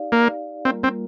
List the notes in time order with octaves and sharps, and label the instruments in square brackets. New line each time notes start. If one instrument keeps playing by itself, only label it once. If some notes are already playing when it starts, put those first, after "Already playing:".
Already playing: [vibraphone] D#4 G4 D5 F5
[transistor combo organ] A#3
[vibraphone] G3 A#3 F4 A#4 [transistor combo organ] C4
[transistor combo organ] C4